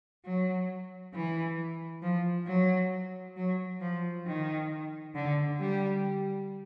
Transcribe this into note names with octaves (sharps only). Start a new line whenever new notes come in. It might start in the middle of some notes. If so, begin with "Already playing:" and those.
F#3
E3
F3
F#3
F#3
F3
D#3
D3
G3